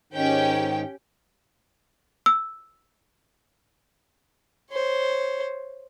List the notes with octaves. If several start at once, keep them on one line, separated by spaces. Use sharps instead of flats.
G#2 D#3 C#4 D#4 G4 G5
E6
C5 C#5